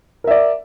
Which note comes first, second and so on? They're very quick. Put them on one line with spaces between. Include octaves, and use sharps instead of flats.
A#4 E5 D5